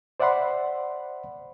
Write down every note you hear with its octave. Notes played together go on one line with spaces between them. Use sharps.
C5 D5 E5 F#5 B5 C6